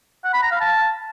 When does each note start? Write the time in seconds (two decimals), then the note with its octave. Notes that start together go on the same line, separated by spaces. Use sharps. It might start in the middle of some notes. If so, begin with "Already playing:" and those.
0.24 F#5
0.33 B5
0.42 A#5
0.52 F5
0.61 A5